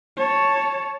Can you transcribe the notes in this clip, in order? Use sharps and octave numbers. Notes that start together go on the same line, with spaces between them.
C#5 A5